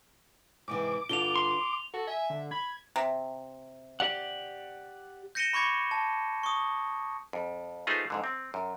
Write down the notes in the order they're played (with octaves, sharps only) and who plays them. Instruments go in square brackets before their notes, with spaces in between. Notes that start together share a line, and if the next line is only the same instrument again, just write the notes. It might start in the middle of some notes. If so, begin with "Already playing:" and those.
[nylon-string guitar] G#2 C3 E3 [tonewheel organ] D6
[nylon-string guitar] G2 D3 F4 [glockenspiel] F7 G7
[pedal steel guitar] C6
[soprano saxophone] F#4 [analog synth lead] A4
[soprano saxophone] E5 [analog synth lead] G#5
[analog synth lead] D3
[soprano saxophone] B5 [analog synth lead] G#6
[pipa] C3
[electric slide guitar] G4 D5 F#5
[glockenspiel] G6 A#6 C#7 D#7 E7 G7
B5 C#6 D6 G#6 C#7
A5
C#6 D#6
[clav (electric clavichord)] F2
A3 D#4 F4 G#4 B4 C5
F2 G#2 D3
C4
F#2